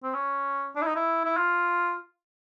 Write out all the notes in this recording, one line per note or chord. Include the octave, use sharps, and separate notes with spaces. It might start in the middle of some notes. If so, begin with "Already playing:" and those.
C4
C#4
D4
E4
D#4
E4
E4
F4